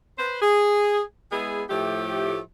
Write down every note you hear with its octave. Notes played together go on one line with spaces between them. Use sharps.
B4 C5
G#4
G#3 B3 E4 G#4
A2 F3 A3 G4